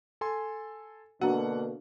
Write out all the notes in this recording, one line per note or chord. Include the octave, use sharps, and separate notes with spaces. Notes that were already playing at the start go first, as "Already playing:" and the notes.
A4 G#5 C6
B2 D3 A#3 D4 F#4 F#5